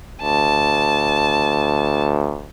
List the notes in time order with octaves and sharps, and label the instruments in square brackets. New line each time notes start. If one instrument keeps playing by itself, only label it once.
[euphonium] D2 [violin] A5